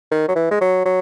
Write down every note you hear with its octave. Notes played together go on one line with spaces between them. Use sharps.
D#3
F#3
E3
G#3
F#3
F#3